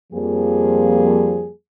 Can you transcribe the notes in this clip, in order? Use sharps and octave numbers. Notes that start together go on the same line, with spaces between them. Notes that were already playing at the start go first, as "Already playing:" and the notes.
F2 F3 G3 A#3 G#4